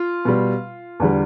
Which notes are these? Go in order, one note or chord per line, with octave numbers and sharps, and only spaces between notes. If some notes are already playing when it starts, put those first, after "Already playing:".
Already playing: F4
B2 G3
E2 D3 G3